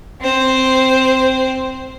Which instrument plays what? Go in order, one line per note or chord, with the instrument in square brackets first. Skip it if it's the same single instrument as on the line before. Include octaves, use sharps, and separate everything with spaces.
[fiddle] C4 C5